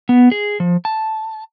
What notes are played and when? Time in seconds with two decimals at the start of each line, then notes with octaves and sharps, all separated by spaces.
0.09 B3
0.32 G#4
0.60 F3
0.85 A5